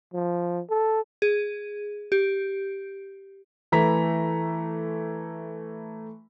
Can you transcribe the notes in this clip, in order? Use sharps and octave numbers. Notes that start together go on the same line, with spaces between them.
F3
A4
G#4
G4
E3 A3 A#5 B6